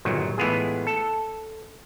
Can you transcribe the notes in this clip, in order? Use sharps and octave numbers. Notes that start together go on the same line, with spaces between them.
G1 A#2 D#3 F#3
A2 E3 G#3 B3 F4 G#4
A4